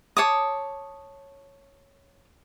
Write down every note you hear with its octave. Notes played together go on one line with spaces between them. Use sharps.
C#5 A5 D6 D#6